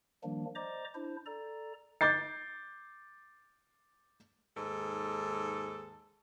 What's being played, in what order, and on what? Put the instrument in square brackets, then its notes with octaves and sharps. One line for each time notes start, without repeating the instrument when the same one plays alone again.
[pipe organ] D#3 F3 G3 A#3 D4
C5 D5 D#5 A#5 D6
D4 E4 C5
A4 D5 A#5
[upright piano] D6 G6 A6 C7
[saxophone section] D#2 G#2 A4